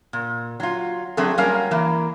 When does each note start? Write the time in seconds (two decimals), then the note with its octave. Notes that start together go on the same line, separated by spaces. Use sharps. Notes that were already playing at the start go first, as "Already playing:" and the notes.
0.13 A#2
0.60 F#3 F4
1.17 F#3 A3 C4 D4 G#4 A4
1.38 F#3 G3 A#3 C#4 A#4 F5
1.71 E3 A#3